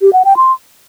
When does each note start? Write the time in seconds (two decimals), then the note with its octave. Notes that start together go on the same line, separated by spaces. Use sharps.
0.01 G4
0.13 F#5
0.25 G5
0.37 C6